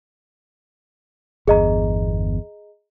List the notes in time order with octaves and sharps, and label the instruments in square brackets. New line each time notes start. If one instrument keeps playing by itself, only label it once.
[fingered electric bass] G1 E2 [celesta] G#4 D#5 A#5